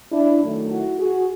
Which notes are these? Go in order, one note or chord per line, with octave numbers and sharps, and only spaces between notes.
D4 E4
F#2 D#3 F#3 A3
E4 F#4
F#4 G#4